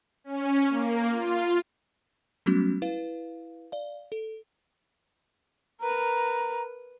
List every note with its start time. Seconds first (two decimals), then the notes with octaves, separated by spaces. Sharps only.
0.24 C#4
0.69 A#3
1.10 F4
2.46 F#3 G3 A3 B3 C#4 F#4
2.82 E4 B4 F5
3.72 D5 F5
4.12 A4
5.81 A#4 B4 A#5